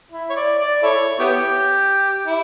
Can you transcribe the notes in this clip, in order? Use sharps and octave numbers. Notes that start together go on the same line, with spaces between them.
E4
C#5
D5
D5
E4 A4 C#5
B3 E4 G4
E4